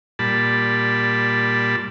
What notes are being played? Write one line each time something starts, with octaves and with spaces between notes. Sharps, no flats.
A#2 G3 A5 B5